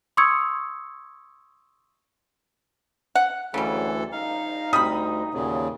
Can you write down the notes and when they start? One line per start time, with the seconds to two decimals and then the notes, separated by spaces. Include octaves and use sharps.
0.17 C6 C#6 D#6 E6 G#6 C#7
3.15 F#5
3.54 D2 C#3 E3 F#3 G3 G#4 A4
4.12 A#1 D#4 F5
4.73 D2 G3 B5 D#6
5.34 D#2 A#2 C#3 E3 F#3 C#4